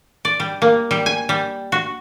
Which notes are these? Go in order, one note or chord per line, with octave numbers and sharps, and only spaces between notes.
D5
G3
A#3
G3
G#5
G3
F#4